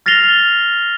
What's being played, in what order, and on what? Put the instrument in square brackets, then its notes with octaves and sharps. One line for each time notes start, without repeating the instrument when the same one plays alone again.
[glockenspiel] F6 A6 A#6 C7 F7 G7